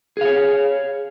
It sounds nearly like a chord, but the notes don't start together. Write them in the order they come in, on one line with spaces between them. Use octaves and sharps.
G#4 F5 C#5